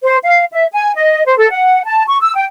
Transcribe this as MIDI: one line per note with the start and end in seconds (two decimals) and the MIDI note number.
0.03 0.17 72
0.24 0.43 77
0.52 0.65 76
0.71 0.93 80
0.95 1.25 75
1.25 1.37 72
1.38 1.48 69
1.51 1.81 78
1.85 2.04 81
2.07 2.18 85
2.21 2.33 88
2.35 2.44 79